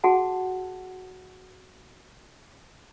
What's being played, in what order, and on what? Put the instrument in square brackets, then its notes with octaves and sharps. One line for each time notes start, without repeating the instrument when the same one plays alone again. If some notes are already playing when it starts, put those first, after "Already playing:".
[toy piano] F#4 G#4 F#5 A5